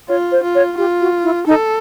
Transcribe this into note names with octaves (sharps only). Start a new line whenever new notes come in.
F4 C#5
C5
F4
C#5
F4 G4
F#4
E4
D#4 A4